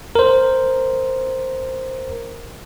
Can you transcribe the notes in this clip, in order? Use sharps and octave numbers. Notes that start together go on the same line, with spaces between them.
A#4 C5